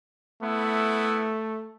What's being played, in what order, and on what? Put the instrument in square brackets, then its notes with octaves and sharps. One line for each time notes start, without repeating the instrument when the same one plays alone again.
[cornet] A3 [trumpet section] B3 E4